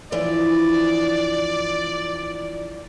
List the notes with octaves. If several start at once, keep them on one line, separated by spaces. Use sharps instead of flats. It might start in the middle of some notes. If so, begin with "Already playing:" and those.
E3 F3 D4 D5